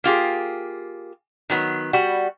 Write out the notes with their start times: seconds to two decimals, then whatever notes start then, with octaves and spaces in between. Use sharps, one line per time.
0.04 A#3 F4 G4 G#4
1.50 D#3 F#3 B3
1.93 G3 F#4